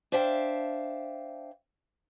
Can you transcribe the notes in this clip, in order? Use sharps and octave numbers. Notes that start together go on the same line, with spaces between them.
D4 C5 E5 F5 G5